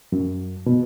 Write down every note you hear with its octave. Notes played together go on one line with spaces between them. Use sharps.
F#2
B2